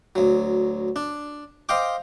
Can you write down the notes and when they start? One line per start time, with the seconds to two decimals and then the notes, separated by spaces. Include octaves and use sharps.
0.15 D2 F#3
0.96 D4
1.69 C5 D#5 F5 G5 D6